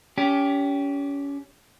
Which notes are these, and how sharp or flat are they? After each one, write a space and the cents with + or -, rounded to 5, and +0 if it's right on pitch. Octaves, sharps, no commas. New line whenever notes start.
C#4 +30 G4 +0